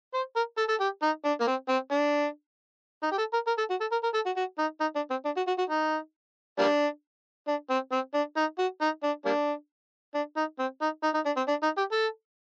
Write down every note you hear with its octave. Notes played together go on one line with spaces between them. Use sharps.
C5
A#4
A4
A4
G4
D#4
D4
A#3
C4
C4
D4
D#4
G4
A4
A#4
A#4
A4
F#4
A4
A#4
A#4
A4
F#4
F#4
D#4
D#4
D4
C4
D4
F#4
F#4
F#4
D#4
G3 A#3 D4
D4
C4
C4
D4
D#4
F#4
D#4
D4
G3 A#3 D4
D4
D#4
C4
D#4
D#4
D#4
D4
C4
D4
D#4
G4
A4